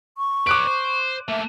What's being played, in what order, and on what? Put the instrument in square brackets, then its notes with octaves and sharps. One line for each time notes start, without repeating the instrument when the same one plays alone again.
[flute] C#6
[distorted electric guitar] B4 C#5 [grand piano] D6 F#6 D7
[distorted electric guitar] C5
[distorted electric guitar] A3 A#3 [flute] E5